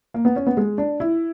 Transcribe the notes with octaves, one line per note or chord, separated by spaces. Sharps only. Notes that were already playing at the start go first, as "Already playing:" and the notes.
A#3
B3
C#4
B3
G#3
D4
E4